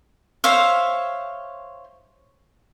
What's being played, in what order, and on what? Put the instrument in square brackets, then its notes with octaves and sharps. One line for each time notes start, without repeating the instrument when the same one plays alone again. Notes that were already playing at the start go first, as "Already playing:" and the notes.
[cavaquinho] C5 C#5 E5 F5